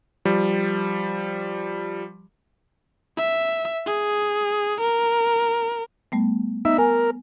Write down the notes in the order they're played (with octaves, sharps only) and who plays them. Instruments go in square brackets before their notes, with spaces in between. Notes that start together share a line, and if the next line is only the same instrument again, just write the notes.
[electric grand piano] F3 G3
[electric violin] E5
G#4
A#4
[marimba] G3 A3 B3
[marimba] B3 [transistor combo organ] D#4 E5
[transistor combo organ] A#4 [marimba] G#5